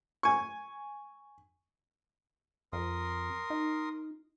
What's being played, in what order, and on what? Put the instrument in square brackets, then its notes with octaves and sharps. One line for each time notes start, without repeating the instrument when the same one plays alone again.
[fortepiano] G#5 C#6
[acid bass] F2 [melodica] A#4 C6 D#6
[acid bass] D#4